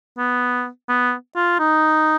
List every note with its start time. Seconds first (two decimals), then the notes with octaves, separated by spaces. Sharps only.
0.18 B3
0.88 B3
1.35 F4
1.59 D#4